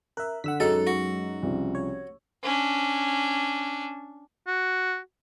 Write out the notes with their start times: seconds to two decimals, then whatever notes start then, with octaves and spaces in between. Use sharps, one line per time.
0.17 A#4 E5 F#6
0.44 D3 F#5 E6 B6
0.60 F#2 F#3 G#3 D#4 A4 A#5 E6
0.87 F#4
1.43 C2 C#3 F3
1.75 C#5
2.43 C#4 D4
4.48 F#4